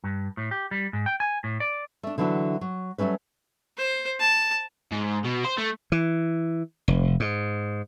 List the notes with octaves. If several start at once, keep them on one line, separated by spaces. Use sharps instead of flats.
G2
A2
G4
G3
G#2
G5
G#5
A2
D5
A3 D4
D3 E3 F#3 D4 E4 F#4
F#3
F#3 G3 A3 C#4 B4
C5
A5
G#2
B2
C5
A3
E3
F1
G#2